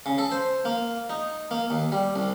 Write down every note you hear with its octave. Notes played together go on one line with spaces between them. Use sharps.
C#3
A4
C5
A#3
D#4
A#3
D#2
G3
C2